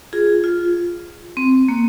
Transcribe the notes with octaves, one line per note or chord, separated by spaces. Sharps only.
F4 G#4
F4
C4
A#3